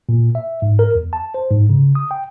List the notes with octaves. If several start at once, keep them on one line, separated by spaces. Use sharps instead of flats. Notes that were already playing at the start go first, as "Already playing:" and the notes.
A#2
E5
G#2
A#4
E2
A5
C5
G#2
C#3
D#6
G5